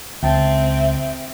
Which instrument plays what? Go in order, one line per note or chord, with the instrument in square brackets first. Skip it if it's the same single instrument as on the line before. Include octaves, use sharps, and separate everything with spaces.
[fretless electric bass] C#2 [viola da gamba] C4 [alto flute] E5 [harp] G5 A5